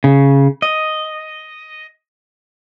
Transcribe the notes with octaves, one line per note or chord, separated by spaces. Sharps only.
C#3
D#5